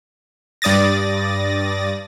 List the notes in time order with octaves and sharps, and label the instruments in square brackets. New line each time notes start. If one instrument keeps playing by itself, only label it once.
[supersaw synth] G2 D5 D#6 A6 A#6